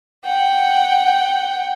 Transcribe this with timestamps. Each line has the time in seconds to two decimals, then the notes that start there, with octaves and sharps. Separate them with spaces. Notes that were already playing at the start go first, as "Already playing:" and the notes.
0.23 F#5 G5